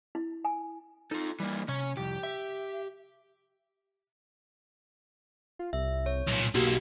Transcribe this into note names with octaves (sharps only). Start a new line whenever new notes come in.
E4
G#5
D#4 F4 A4
E3 G3 A#3
C3 C#4 C#5
C2 F2 G4
E5
F4
C2 E5
C#5
B1 A#2
B1 A#3 F#4 G4